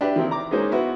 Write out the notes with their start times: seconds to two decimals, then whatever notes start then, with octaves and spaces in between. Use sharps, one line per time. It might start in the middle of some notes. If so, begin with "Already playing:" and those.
0.01 D4 G4 B4 E5
0.16 D#3 A#3 C4 E4
0.31 A#5 D6
0.51 G#3 A#3 C#4 D#4 G#4 C5
0.72 B3 E4 F#4 B4